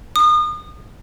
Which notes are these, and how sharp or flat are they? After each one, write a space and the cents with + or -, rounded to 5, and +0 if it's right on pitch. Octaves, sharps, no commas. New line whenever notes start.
D#6 -35